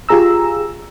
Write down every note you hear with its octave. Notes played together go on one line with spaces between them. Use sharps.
F4 G4 G#4 A#5 E6